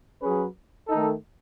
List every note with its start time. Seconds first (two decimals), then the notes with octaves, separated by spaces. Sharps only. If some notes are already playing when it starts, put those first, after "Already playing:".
0.22 F#3 C#4 G#4 B4
0.88 D#3 A3 D#4 A4